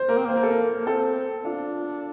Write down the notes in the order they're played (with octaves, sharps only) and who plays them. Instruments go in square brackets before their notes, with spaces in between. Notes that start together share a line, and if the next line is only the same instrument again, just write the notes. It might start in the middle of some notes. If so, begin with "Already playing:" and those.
Already playing: [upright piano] C5
[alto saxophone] A#3 [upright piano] A#4
[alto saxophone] C4
[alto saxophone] A#3 [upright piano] C5
[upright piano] A#4
A4
A#4
[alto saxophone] A#3
[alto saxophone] C4 [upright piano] A4
[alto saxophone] D4 [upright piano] F4